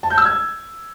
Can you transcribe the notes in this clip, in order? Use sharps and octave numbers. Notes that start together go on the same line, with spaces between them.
A5
G6
E6
G#6